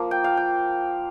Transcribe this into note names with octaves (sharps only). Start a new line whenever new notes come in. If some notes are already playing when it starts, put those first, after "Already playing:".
Already playing: F3 A#3 F4
G5
F5
G5